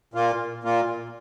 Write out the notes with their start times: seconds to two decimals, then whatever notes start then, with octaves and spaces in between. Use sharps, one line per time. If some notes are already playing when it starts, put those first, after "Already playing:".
0.14 A#2 A#3 F4
0.63 A#2 A#3 F4